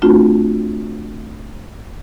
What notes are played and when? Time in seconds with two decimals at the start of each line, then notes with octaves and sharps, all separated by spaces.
0.02 A3 C4 D4 F4 F#4